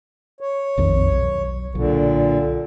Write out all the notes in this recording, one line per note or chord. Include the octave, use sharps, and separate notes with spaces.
C#5
A#1 F2 D#3
B1
B1 A#2 D3